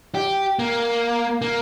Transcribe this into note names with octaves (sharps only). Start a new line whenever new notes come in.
G4
A#3
A#3